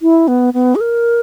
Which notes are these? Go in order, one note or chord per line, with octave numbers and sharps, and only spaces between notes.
E4
B3
B3
G#4
A#4